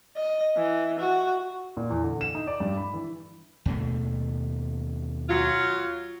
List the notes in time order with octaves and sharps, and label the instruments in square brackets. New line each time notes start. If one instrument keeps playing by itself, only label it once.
[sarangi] D#5
E3
F#4
[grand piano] A#2
E2
D3
E7
D#4
D5
G2
B5
E3
[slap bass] D#2 B2 A3
[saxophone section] F#3 F4